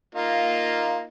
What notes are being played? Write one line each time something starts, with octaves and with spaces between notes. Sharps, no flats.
A#3 D#4 F4